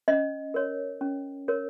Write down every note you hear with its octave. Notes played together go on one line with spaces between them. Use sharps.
C#4 D#5
A#4 C#5
C#4
A#4 C#5